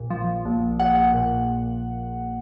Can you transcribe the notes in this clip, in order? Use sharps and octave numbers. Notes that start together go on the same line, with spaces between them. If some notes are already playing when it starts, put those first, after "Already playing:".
Already playing: A#1 A#2
F3
A#1
A#1 F#5
A#2